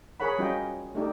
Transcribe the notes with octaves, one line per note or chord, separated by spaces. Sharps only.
G#4 A#4 C#5 F#5 B5
G3 C#4 F4 F#4 D#5 G5
A3 D4 D#4 G4 A4